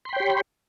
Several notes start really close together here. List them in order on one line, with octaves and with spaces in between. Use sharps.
C6 B5 G5 C#5 G4